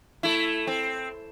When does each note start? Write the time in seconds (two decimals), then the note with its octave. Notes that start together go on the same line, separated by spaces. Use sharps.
0.23 A3 E4
0.67 C4